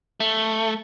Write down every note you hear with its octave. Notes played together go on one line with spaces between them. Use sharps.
A3